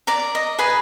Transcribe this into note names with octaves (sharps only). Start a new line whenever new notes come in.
D5 A#5
D#5
G#4 B4 G#5